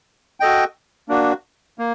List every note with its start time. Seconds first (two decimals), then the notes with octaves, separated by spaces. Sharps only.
0.40 F#4 A4 D#5 G5
1.09 A#3 D4 F#4
1.79 A#3